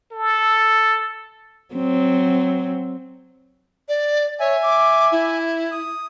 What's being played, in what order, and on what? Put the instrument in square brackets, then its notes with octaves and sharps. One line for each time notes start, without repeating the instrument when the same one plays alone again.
[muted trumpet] A4
[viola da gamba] F#3 C4
[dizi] D5
[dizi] C#5 [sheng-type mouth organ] E5 G#5
[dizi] D6
E4
[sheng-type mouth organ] D#6